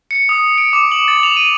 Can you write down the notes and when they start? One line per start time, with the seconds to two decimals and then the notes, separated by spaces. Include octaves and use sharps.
0.11 C#7
0.29 D#6
0.58 D7
0.73 D6
0.92 F#7
1.08 A6
1.23 F7
1.37 D#7